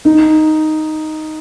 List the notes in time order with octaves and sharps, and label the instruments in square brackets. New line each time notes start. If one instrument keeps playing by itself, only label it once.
[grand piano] D#4